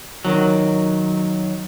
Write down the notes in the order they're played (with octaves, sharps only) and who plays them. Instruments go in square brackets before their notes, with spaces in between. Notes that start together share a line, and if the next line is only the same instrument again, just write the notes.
[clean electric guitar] D#3 F#3